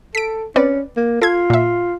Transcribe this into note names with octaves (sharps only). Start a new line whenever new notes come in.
A4 B6 D7
C4 C#4 B4 D5
A#3
F4 A4 G#6
A#2 E5